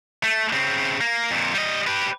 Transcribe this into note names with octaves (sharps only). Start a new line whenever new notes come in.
A3
C#3 C4
A#3
F2 A#2
G3 D#5
G4 B4